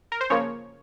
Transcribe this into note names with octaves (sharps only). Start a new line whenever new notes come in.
A#4
C5
C#3 F3 A#3 C#5